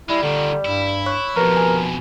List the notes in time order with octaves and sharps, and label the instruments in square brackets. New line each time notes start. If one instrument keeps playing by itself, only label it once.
[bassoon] G3 [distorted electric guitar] G#3 [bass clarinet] E4
[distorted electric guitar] A#2 D#3 [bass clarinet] D3
[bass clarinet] G2 [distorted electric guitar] E4
[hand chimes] C#5 C#6 F#6
[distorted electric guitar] F2 B2 [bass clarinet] F3 [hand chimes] G4 B4 [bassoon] A#4
[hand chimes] G#5